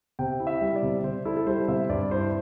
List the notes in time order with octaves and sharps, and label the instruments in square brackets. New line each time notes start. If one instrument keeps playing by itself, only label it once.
[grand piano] C3 G5
E4
E5
G3
D5
C3
C3 C5
E4 A4
A4
G3 C5
C3 E5
G2 D5
E4 C5